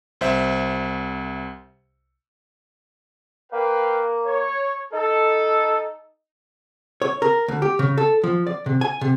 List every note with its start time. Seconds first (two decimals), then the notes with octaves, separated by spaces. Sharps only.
0.21 C2 C5 E5
3.53 A#3 B4 F5 G5
4.26 C#5
4.93 D#4 A4
7.02 C#5
7.22 A#4
7.48 D2
7.62 G4
7.79 C#3
7.97 A4
8.24 F3
8.47 D5
8.66 C3
8.81 G#5
9.01 C3